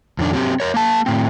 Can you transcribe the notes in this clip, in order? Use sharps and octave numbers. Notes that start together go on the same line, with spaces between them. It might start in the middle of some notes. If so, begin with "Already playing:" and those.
F2 D#3 D4
F#3 C4 G4
A#4 C#5
A#3 A5
A2 C4